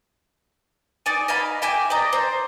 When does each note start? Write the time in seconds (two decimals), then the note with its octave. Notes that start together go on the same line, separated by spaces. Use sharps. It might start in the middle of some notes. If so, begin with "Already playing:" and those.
1.06 D#4 D5 G#5
1.28 D#5 F5 G#5 B5
1.62 E5 G5 G#5 D6
1.90 D5 D#5 A#5
2.13 C5